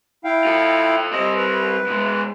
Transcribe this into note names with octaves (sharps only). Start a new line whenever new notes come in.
E4 F5 G5
F4 A4
G3 C4 D#5
B4
B2 G#3